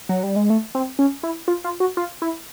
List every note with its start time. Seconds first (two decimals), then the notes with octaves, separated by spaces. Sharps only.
0.09 F#3
0.23 G3
0.36 G#3
0.50 A3
0.75 C4
0.99 C#4
1.23 E4
1.48 F4
1.64 F4
1.80 F#4
1.97 F4
2.22 E4